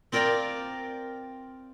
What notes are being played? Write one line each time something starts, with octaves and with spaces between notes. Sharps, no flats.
C4 F4 A#4 D5 G5 A#5